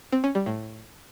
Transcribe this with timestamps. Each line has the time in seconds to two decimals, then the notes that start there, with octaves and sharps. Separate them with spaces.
0.12 C4
0.24 C#4
0.35 G3
0.46 A2